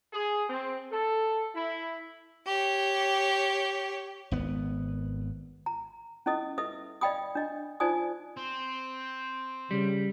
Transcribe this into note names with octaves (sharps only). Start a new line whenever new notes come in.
G#4
C4
A4
E4
G4 C#5
G#1 B3
A#5
C#4 E4 A4 D#5 D#6
A4 B4 D#5 E5 D#6
D5 D#5 F5 G5 B5 D#6
D4 D#5
D#4 F4 C5 D5 G#5 D#6
C4
C#3 G3